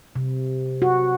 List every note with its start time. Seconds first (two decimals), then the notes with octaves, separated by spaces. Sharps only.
0.16 C3
0.82 F#4